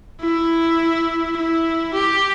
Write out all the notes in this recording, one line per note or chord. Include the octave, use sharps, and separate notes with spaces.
E4
E4
G4